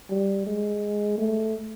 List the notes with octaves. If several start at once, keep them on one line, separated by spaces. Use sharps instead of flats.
G3
G#3
A3